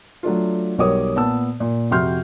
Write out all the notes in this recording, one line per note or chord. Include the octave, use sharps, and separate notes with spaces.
F#3 A3 D4 F4
B1 G3 A#4 C#5 D6 D#6
A#2 B3 A5 E6
A#2
F2 C3 F#4 C6 F6 G6